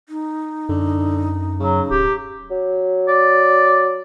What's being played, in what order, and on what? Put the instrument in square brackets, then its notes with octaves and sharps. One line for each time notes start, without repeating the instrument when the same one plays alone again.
[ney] D#4
[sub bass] F#2 [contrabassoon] D3
[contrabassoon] C#3 [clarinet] F#3
[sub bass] D1 [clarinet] G4
[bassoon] F#3
[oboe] D5